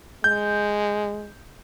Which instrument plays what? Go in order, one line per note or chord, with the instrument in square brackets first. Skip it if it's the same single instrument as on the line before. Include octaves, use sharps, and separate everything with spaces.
[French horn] G#3 [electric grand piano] G6